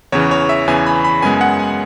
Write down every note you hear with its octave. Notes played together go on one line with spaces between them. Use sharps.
E2 C#3 E3 C#5
C#5
E5
E2 C#3 E3 G#5
B5
B5
F#2 C#3 G#3 B3 G#5
F#5
G#5